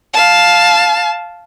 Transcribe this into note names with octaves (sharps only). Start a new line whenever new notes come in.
F5 A5